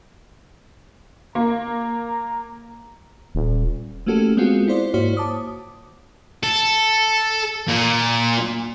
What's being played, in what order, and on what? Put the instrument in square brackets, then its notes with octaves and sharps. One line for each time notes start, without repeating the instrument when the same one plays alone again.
[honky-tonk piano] A#3 [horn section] A#5
[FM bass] D#1
[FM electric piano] A3 A#3 C#4 F#4 G4 A4
G#3 B3 C4 F4 F#4 G#4
E4 F4 C5 D5
G#2 A#3 E4 F#4 C5 C#5
A5 D6 D#6
[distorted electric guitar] A4
A#2